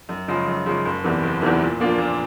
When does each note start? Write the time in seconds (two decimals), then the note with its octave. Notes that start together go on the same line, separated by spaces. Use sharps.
0.09 F#2
0.28 C#3 F3 G#3 C#4
0.47 F#2
0.66 C#3 F3 G#3 C#4
0.85 F#1
1.04 E2 C3 E3
1.23 F#1
1.42 E2 C3 E3
1.61 A#2
1.80 F3 A#3 D4 F4
1.98 A#2